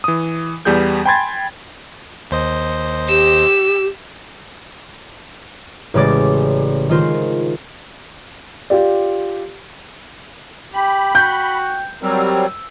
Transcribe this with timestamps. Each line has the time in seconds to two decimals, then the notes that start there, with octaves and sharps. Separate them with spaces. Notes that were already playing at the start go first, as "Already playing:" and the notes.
0.04 E3 D#6
0.65 E2 G3 B3 G#4 G6
1.06 G5 G#5 B5 C6 G#6 A6
2.31 D#2 C5 D#5
3.09 G4 E6
5.94 A1 C#3 G#3 D5 A6
6.89 D#3 G#3 F4 C5
8.70 F4 G4 D5
10.74 G4 G5 B5
11.15 F#4 G6
12.02 F#3 G3 C4 A#4 E6